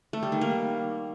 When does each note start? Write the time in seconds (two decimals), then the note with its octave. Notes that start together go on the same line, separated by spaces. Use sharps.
0.13 A3
0.23 G3
0.32 D#3
0.41 A#3